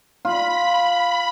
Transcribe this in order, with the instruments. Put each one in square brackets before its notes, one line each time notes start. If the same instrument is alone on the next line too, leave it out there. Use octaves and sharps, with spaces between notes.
[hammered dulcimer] F4 [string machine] B5